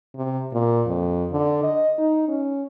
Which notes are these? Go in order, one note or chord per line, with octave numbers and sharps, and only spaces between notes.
C3
A#2
F2
D3
D#5
D#4
C#4